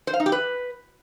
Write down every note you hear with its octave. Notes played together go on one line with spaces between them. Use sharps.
C5
F5
D#4
G4
B4